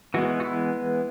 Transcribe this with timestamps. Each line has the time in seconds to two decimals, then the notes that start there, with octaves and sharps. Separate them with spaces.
0.14 E3 G#3 B3 F#4
0.40 F#4
0.44 E4